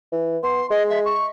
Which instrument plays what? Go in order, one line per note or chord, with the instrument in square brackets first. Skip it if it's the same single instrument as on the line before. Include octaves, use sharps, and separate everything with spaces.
[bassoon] E3
[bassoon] B3 [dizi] C6
[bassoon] G#3 [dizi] D#5
[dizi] E5
C#6